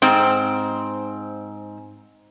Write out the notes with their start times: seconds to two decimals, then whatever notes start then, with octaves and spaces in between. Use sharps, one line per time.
0.02 G#2 C4